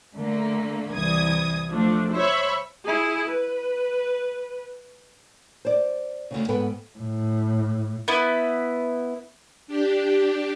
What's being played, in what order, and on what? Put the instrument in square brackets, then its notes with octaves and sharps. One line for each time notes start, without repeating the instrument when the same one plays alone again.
[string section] D3 A3 A#3
C2 E3 D#6 G#6
F3 A3 D4
C5 C#5 E5 B5 C#6
[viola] E4 G#4
B4
[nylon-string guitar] C5 D5
D2 G#2 C#3
G#2 B3 A4 B4 G5
[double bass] A2
[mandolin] B3 E4
[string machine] D4 G4